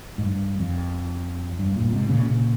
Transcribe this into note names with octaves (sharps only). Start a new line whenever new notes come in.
G#2
G2
F2
G2
G2 A#2
G#2 C3
A#2 C#3
A#2 C#3